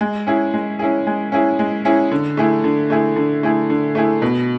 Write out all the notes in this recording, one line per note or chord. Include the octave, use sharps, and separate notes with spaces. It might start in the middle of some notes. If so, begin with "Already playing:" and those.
G#3
C#4 E4 G#4
G#3
C#4 E4 G#4
G#3
C#4 E4 G#4
G#3
C#4 E4 G#4
D3
A3 E4 G#4
D3
A3 E4 G#4
D3
A3 E4 G#4
D3
A3 E4 G#4
B2